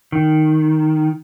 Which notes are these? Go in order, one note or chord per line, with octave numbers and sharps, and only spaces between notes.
D#3